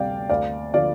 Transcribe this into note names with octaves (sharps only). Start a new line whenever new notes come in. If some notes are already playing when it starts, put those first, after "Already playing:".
Already playing: D2 C3 G3 D5 F5 G5
D2 D5 F5
D3 F3 D5 F5